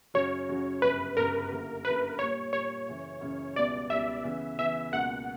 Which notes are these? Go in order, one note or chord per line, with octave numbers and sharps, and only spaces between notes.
F#2 C#3 F#3 C#4 F#4 C#5
F#2 C#3 F#3 C#4 F#4
G1 F#2 C#3 G3 B4
G1 F#2 C#3 G3 A#4
F#2 D3 A#3 E4 G4
F#2 D3 A#3 E4 G4 B4
A#2 G3 A#3 C#5
A#2 G3 A#3 C#5
F#2 C#3 E3
F#2 C#3 E3
C#2 B2 G3 B3 E4 D5
C#2 B2 G3 B3 E4 E5
C#3 E3 B3
C#3 E3 B3 E5
C#2 B2 A#3 F#5